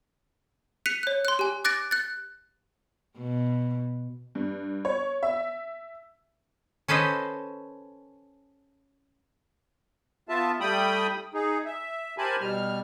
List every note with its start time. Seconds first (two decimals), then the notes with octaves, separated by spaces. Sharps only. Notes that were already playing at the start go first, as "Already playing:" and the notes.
0.86 F#6 B6 C#7 D#7 F7
1.03 C#5 F#6
1.25 C6 F#6
1.39 G4 G#5
1.64 D6 F#6 A6 A#6 D7
1.91 F#6 A6
3.18 B2
4.35 G2
4.85 C#5
5.23 E5
6.88 C#4 A4 B4 C5 D#5
10.29 B3 F4 E5 A5
10.60 G3 A3 G5 B5 D#6
11.34 D#4 G#4
11.65 E5
12.18 G4 A#4 C5 G#5 A5 B5
12.40 B2 G3 F6